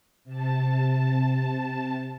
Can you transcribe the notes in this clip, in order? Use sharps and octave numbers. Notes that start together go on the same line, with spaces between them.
C3 A5